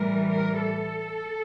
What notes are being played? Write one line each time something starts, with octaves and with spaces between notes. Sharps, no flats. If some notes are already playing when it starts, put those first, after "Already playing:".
Already playing: A2 E3 G3 A#4
A#4
A4